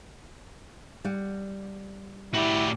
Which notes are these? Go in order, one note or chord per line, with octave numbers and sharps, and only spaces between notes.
G3 F#5
A2 E4 F#4 G4 D5